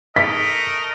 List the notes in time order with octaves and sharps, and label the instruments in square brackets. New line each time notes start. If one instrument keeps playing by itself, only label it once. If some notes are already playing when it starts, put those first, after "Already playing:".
[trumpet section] A3 A#4 D#5 [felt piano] B6